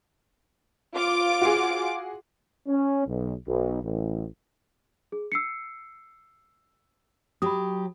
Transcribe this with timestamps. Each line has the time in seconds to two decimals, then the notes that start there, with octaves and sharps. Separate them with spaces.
0.95 F4 D6 D7
1.42 F#4 G#4
2.67 C#4
3.06 B1
3.47 B1
3.82 A1
5.12 G#4
5.32 E6 C7 C#7
7.42 F#3 G4 B5 D#6